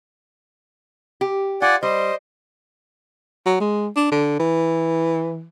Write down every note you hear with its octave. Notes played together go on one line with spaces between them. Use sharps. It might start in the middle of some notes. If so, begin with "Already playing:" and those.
G4
F4 D5 F#5 G#5
G3 C5 D#5
F#3
G#3
D4
D3
E3